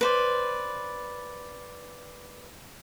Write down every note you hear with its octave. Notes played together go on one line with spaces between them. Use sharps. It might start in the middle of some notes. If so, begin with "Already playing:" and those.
B4 C5 D5